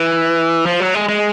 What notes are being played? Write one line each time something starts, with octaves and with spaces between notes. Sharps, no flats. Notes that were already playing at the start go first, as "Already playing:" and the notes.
Already playing: E3
F3
F#3
G#3
G#3